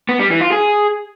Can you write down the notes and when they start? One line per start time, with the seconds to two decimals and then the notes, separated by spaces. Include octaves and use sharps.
0.09 B3
0.20 G3
0.30 E3
0.41 F4
0.52 G#4